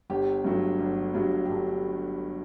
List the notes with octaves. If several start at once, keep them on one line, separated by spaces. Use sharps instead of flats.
G1 G4
G2 F#3 A3
G1
G2 F#3 A3
G4
G1 A4